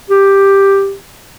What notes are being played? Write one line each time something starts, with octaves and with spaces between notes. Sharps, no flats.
G4